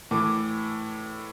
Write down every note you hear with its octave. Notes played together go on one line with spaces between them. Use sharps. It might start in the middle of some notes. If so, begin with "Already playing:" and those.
A2 E3 D6